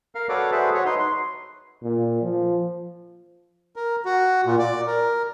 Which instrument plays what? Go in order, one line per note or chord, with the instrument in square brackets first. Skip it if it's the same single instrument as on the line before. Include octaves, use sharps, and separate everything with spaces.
[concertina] A#4 F5
F#4 A4 B4 C#5 D5 D6
F#4 G#4 A4 B4 C5 E5
F#4 C#5
D#4 B4 C6
C6
[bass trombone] A#2
F3
[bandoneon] A#4
F#4
A#2
D5
A#4